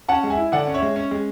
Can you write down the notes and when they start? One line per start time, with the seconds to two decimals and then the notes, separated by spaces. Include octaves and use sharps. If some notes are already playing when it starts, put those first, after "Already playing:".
0.08 C#4 F#5 A5
0.23 G#3
0.30 E5 G#5
0.37 E4
0.52 D3 D5 F#5
0.67 C#4
0.74 C#5 E5
0.82 G#3
0.96 C#4
1.11 G#3